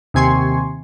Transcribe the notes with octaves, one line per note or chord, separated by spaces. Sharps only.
D#2 C3 G#5 C6 C#6